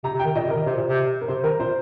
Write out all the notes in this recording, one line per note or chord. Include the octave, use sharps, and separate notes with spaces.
C3 A#5
C3
G5
D#3
A#2 D#5
C3
A#4
D#3
C3 C5
A#2
C3
A#4
C3 C5
D#3 A#4
A#2 C5